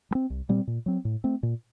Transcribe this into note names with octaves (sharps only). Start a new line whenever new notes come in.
G3
C4
C2
A#2 G3 C4
A#2
F#3 C4
A2
A3 C4
A#2